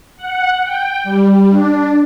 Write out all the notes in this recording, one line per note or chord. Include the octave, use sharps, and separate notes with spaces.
F#5
G5
G3
D4